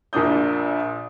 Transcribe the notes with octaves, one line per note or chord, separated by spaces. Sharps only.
A#1 A#2 A#3 D4 D#6 G6